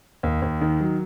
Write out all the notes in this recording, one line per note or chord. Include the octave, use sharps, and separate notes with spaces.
D#2
D#2
D#3
F#3